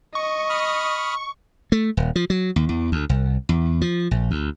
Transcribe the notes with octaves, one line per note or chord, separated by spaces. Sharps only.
D#5 C#6
B5 D#6 F6
A3
D#1
F3
F#3
D#2
E2
D2
C2
E2
F3
A#1
D2